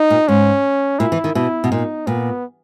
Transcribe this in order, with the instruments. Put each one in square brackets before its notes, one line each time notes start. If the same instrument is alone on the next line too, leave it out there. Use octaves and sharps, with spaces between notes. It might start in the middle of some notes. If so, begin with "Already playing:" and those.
Already playing: [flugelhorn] D#4
[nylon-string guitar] A#2
[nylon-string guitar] G#2 [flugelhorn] C#4
[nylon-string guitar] A#2 [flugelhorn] E4
[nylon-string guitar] E3
D#3
[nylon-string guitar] B2 [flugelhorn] E4
[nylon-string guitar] B2
[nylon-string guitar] A#2 [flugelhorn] D#4
[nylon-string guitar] A#2 [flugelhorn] B3